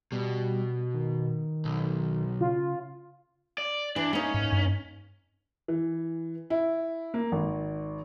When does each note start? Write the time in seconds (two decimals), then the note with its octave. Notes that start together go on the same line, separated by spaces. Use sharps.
0.12 B2 G3
0.94 D#3
1.65 B1
2.41 C#3 F4
3.58 D5
3.96 E3 D4
4.13 A#3 C#4 D#4
4.34 G#2
4.53 G2
5.68 E3
6.50 E4
7.14 A#3
7.32 G#1